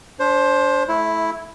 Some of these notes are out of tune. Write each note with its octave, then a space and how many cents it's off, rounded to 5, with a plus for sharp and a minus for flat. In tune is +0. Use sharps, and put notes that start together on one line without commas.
D4 -30 C5 +15
A3 -25 E4 +0